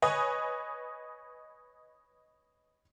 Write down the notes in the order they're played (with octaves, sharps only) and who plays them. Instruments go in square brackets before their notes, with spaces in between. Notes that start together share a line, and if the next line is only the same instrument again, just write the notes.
[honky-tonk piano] B4 C#5 D#5 G#5